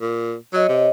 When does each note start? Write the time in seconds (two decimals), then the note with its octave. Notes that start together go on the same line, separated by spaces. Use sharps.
0.01 A#2
0.53 F#3 C#5 D#5
0.69 C3